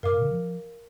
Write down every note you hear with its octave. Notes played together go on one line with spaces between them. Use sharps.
G2 A#4 F5 D6 F6
A#2
D3
F3